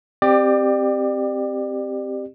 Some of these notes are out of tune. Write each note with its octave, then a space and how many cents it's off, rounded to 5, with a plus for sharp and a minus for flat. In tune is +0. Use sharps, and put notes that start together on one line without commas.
C4 +0 G4 +5 D5 +30